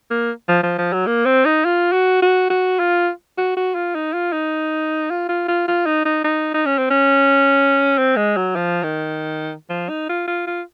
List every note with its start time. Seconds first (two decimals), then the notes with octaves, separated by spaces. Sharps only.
0.11 A#3
0.48 F3
0.63 F3
0.78 F3
0.93 F#3
1.07 A#3
1.26 C4
1.45 D#4
1.65 F4
1.92 F#4
2.22 F#4
2.50 F#4
2.79 F4
3.38 F#4
3.56 F#4
3.75 F4
3.95 D#4
4.13 F4
4.33 D#4
5.10 F4
5.29 F4
5.48 F4
5.68 F4
5.86 D#4
6.05 D#4
6.24 D#4
6.54 D#4
6.66 C#4
6.78 C4
6.90 C#4
7.98 C4
8.16 G#3
8.37 F#3
8.56 F3
8.83 D#3
9.70 F3
9.89 D#4
10.09 F4
10.27 F4
10.47 F4